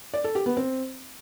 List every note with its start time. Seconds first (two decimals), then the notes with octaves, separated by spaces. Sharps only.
0.14 D5
0.24 A4
0.35 G4
0.46 B3
0.57 C4